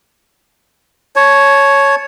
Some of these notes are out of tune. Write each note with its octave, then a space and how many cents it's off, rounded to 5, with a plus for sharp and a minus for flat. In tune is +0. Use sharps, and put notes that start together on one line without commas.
C#5 +0 A5 -25